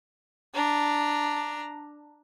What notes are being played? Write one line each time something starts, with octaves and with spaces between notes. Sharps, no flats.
D4 A#5